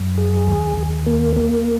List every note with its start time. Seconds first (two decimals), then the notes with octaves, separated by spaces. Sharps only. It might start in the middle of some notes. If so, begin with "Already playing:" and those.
Already playing: F#2
0.18 G#4
0.47 D#2
0.77 D#2
1.06 A#3
1.36 A#3